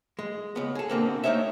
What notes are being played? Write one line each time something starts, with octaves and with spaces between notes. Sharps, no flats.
G#3
C#2 B3
G#4 A4
B2 D3 A#3 C4
A3 A#3 D#4 C5 C#5 E5